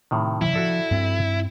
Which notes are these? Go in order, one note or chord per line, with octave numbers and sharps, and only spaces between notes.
A2 C3 D#3
C#3 F3 E4
F3 F#4 A4 D5
G2 C4